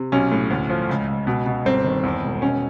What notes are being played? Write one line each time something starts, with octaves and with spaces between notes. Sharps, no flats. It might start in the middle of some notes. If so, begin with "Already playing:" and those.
Already playing: C3
B1 C#4
A2
D2
F3
C#2
C#2
B2
B2
G1 C4
D#3
E2
E1
B2 C#4